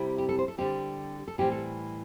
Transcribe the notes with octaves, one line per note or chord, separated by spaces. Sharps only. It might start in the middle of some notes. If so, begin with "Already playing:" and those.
Already playing: C3 G3 C4 E4
G4
A4
C5
A4
D3 G3 C4 G4
A4
A2 E3 G3 C4 G4
A4